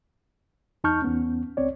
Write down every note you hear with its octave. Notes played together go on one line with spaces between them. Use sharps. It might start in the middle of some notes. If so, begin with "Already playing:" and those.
E2 D#4 A5 C#6 F6 G6
E2 B3 C#4
C#2 C4 C#5 D5